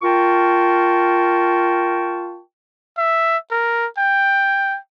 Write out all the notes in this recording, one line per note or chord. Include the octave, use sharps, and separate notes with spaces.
F4 A#4 G5 A5 C#6
E5
A#4
G5